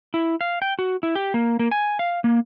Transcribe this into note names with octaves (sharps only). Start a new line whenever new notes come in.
E4
F5
G5
F#4
E4
G4
A#3
A#3
G#5
F5
A#3